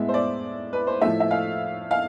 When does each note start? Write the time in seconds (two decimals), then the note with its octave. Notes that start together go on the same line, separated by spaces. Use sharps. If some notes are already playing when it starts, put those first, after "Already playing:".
Already playing: A2 G#3 B3 E5
0.08 C5
0.14 D5
0.73 B4
0.87 C5
1.01 A2 F3 A3 E5
1.20 E5
1.31 F5
1.91 F5